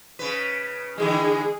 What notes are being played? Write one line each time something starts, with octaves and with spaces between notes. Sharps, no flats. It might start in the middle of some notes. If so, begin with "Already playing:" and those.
C#3 B4
D3 E3 G#3 G#4